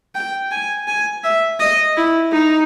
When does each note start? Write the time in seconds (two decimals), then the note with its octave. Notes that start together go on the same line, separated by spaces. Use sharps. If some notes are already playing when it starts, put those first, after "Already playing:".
0.15 G5
0.51 G#5
0.88 G#5
1.24 E5
1.60 D#5
1.97 E4
2.33 D#4